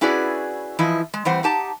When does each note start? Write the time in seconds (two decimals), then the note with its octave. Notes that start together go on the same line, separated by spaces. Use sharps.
0.01 C#4 E4 F#4 G#4 B4 D5
0.79 E3 F3 E4 D#5
1.14 G#3
1.25 E3 G3 C4 C5 F#5
1.43 D#4 G4 A5